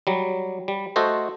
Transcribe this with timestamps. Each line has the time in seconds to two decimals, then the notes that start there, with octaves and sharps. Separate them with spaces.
0.07 F#3 G3
0.68 G3
0.96 A3 F#4 A4 C5 D#5